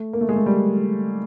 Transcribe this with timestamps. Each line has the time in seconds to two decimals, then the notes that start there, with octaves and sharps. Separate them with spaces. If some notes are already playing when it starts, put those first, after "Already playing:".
Already playing: A3
0.13 A#3
0.21 A3
0.29 G#3
0.36 A3
0.46 G3